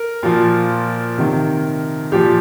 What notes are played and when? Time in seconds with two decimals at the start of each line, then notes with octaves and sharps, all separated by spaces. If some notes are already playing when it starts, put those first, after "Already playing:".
Already playing: A#4
0.23 A#2 F3
1.18 C3 D#3
2.12 A#2 F3 G4